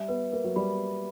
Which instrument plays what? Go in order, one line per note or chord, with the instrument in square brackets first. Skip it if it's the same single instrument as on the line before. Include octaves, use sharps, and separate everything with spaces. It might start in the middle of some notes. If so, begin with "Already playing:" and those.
Already playing: [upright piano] G3 [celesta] E5
[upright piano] B3 [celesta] B4
[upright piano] A#3 [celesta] B4
[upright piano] F#3
[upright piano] G3 [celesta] B5